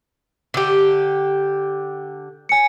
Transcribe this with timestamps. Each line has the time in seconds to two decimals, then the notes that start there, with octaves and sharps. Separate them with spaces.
0.54 D3 G4
2.49 G#5 C#7